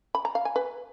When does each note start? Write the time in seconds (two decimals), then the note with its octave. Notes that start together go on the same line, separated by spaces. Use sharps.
0.15 B5
0.25 A#5
0.35 F5
0.45 G#5
0.56 B4